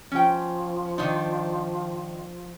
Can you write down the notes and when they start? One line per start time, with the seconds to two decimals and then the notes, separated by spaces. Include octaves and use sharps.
0.12 F3 C#4 G5
0.98 D#3 D4 D#4